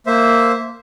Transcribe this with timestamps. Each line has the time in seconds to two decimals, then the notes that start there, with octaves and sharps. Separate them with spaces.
0.07 A#3 C5 E5